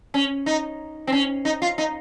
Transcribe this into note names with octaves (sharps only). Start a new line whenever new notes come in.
C#4
D#4
C4
C#4
D#4
F4
D#4